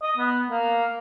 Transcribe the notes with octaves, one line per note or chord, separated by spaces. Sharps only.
D#5
B3
A#3